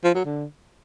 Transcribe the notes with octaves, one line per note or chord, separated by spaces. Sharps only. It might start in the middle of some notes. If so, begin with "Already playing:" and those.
F3
F#3
D3